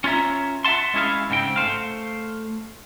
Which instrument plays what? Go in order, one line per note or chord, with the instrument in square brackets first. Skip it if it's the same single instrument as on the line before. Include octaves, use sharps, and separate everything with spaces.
[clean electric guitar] C#4 F4 C#5 E5 A#5
E5 F#5 A5 C6
G#3 C#4 E4 G#4 E5 F5
G#2 C#3 C4 G5
A3 C5 F5